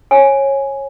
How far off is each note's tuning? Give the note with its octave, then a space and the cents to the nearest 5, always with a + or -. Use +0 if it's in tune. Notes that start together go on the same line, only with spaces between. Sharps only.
C#5 -20 G#5 +0